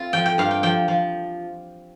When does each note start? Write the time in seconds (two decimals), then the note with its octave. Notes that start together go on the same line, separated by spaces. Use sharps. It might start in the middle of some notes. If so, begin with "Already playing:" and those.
Already playing: C4 F4
0.13 F3 G5
0.26 G5
0.38 G2 F5
0.51 G5
0.63 F3 G5
0.88 F3